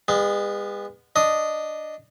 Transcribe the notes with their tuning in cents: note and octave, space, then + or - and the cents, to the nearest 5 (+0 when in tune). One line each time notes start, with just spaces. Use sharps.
G#3 -40 B3 +0
D4 +0 D#5 -5